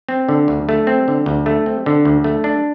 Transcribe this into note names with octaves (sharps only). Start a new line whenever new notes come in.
C4
D3
D2
A3
C4
D3
D2
A3
C4
D3
D2
A3
D4